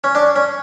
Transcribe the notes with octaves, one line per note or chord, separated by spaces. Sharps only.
C#4
D4
C#4